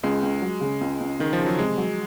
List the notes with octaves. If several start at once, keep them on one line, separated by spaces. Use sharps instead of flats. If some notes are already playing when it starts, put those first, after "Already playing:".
C#2 G#3
C#2
F#3
C#3
C#2
C#2
C#2 D#3
F3
C#3
F#3
C3 G#3
F#3